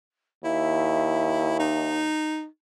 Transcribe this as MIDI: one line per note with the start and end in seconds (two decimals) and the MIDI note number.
0.44 2.11 39
0.44 1.56 64
0.44 1.89 76
1.59 2.45 63